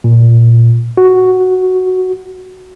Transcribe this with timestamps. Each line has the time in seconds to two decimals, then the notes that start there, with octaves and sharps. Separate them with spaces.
0.04 A#2
0.97 F#4